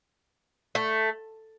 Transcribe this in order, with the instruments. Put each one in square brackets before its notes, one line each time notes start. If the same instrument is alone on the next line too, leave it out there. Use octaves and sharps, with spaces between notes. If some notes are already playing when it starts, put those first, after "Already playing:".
[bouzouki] A3